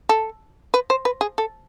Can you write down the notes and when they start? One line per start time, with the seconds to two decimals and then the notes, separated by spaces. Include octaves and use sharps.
0.09 A4
0.74 B4
0.90 C5
1.05 B4
1.21 G#4
1.38 A4